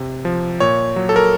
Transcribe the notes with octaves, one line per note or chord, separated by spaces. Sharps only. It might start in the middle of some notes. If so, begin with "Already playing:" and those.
Already playing: C3
F3
A#2 C#5
F#3
A4
A#4